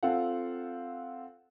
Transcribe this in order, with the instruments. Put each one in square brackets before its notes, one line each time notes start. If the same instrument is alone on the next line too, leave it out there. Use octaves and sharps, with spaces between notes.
[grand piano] C4 F4 A4 F5 F#5